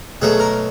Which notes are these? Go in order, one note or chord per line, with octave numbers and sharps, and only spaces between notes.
B2 F#3 A3 G#4
A#4